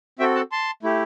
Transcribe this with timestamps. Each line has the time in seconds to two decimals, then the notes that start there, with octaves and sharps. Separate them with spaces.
0.19 C4 F#4 A4 E5 G5
0.35 F#5 A5
0.52 A5 C6
0.83 A3 E4 G4